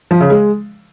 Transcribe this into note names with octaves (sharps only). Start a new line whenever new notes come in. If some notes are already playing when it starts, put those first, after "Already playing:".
F3
C#3
G#3